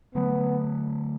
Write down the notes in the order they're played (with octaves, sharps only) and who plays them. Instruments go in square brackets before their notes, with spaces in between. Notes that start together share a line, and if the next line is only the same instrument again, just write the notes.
[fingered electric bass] D3 F#3 A3 [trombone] B3